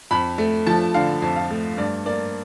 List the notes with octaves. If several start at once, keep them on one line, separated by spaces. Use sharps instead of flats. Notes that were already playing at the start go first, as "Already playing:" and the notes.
F2 B5
A3
F3 A5
D3 F5
F2
F5
A3
G2 D5
A#3 D5